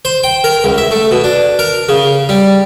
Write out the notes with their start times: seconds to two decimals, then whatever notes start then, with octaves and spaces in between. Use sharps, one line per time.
0.05 C5
0.23 G5
0.44 A#4
0.64 C#2
0.78 E5
0.91 A3
1.11 B2
1.24 D4
1.59 A#4
1.89 C#3
2.29 G3